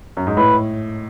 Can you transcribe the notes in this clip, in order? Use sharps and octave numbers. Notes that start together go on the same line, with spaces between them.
F#2
G#2
A2 B4